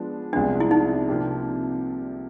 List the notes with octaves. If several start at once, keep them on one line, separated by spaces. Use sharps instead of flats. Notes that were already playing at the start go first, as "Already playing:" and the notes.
Already playing: F3 G#3 B3 D4
C2 C3 F3 G#3 B3 D4
E4
D#4
C3 F3 A#3 D4 G4